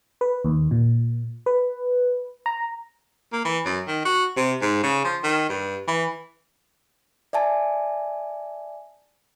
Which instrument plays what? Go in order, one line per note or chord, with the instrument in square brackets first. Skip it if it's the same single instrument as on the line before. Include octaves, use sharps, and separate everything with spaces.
[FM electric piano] B4
D#2
A#2
B4
A#5
[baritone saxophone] A#3
E3
F#2
D#3
F#4
C3
G#2
C#3
F3
D#3
G2
E3
[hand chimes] D5 E5 G#5 A5